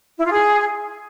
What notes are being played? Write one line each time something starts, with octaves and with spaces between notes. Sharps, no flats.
E4
F4
G#4